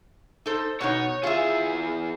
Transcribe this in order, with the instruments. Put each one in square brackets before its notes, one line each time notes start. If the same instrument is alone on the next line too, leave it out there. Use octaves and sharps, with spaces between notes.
[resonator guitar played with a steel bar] D#4 A4 C5
[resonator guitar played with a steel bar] B2 B3 D#4 [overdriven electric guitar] C#5
[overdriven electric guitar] E3 G#4 [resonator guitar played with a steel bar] F4 E5